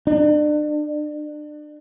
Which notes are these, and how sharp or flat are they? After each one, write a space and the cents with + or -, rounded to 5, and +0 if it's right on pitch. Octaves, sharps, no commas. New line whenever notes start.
D4 +35